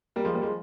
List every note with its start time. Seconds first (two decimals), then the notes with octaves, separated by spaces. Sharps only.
0.16 G3 A#3
0.24 F3 G#3
0.34 G3 A#3
0.42 F3 G#3